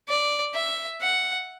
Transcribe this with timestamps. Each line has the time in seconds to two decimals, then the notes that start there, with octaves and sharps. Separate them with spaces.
0.08 D5
0.54 E5
1.01 F#5